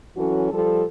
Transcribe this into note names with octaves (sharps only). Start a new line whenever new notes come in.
E3 F#3 C#4 F#4 A4
F3 G3 A4